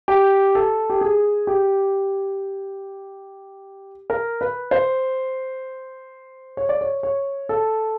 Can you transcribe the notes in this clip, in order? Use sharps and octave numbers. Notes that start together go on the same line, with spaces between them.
G4
A4
G4
G#4
G4
A#4
B4
C5
C#5
D5
C#5
C#5
A4